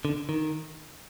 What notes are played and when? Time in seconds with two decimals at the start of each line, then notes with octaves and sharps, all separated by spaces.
0.05 D3
0.29 D#3